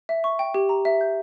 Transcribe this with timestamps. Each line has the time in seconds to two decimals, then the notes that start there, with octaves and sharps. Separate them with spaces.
0.09 E5
0.24 C#6
0.39 G5
0.54 G4
0.69 A#5
0.85 E5
1.01 G6